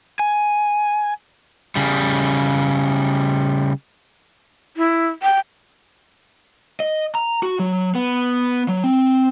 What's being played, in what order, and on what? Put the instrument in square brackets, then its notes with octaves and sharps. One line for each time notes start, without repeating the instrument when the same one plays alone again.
[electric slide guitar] G#5
[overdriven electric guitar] C#3 G3
[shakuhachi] E4
G5
[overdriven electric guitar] D#5
A#5
F#4
F#3
B3
F#3
C4